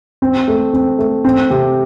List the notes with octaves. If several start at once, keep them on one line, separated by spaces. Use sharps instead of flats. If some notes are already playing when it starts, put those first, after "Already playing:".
C4
A3
C4
A3
C4
C3